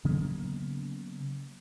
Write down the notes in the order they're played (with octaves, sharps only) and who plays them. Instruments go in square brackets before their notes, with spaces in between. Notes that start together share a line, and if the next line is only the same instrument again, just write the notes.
[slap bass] C#3 F#3 A#3 B3